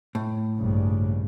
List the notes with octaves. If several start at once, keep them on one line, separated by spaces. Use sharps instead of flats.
A2
A#1 G2 C#3